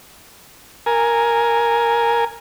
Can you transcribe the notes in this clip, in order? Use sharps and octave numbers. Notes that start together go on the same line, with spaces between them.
A#4 G#5